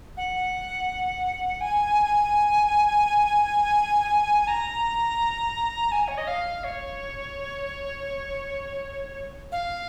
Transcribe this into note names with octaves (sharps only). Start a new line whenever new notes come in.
F#5
G#5
A#5
G#5
C#5
D#5
F5
C#5
F5